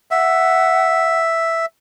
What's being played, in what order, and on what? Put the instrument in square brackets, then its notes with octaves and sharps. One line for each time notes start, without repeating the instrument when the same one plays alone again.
[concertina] E5 [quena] F#5